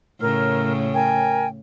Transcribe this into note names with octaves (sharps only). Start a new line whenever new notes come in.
A2 C#3 A#4 F6
A#4 G5 G#5